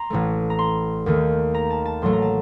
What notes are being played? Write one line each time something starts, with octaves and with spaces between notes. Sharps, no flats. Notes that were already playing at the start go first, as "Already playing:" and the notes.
Already playing: A#5 C6
A1 A2 A3
A#5
C6
D#2 D#3 A3
A#5
A5
A5
A1 A2 F#3 A3 C6
A#5
A5